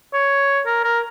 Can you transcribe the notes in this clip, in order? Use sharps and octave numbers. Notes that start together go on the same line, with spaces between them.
C#5
A#4
A#4